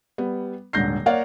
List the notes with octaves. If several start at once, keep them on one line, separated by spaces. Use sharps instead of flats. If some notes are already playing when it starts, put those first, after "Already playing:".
G3 B3
D#1 G#2 D3 G6 A#6 C7
A#3 C#5 D5 F5 F#5